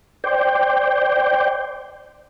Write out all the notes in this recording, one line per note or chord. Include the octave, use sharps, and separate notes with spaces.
C5 D5 G5